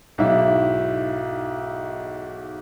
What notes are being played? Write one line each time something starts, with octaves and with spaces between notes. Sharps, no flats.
B1 G#2 E4 E5